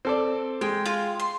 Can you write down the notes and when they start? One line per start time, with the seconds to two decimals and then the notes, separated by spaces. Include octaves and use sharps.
0.05 C4 A4 D5
0.61 G#3 G5
0.85 F4 F5
1.20 C6